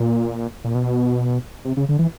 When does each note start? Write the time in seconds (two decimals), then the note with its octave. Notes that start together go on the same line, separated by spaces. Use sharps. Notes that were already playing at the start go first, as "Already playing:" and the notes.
Already playing: A#2
0.64 A#2
0.75 B2
1.65 C3
1.77 C#3
1.89 D3
1.99 E3